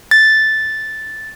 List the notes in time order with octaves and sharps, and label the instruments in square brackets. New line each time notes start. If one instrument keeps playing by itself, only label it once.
[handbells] A6